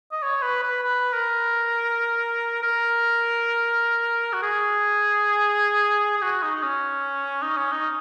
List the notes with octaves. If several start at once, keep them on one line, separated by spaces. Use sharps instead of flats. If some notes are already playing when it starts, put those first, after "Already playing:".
D#5
C#5
B4
B4
B4
A#4
A#4
F#4
G#4
G#4
F#4
D#4
D#4
C#4
D#4
C#4
D#4